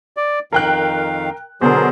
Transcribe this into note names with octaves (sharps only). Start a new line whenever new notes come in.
D5
F2 D#3 A#4 F5 G5 F#6
B2 D3 F#3 G#4 A#4 C5